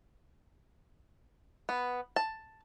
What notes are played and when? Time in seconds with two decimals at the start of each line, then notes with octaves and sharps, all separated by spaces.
1.69 B3
2.16 A5